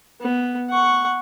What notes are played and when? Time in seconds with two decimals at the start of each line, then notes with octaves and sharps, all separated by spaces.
0.21 B3
0.70 F#5 C#6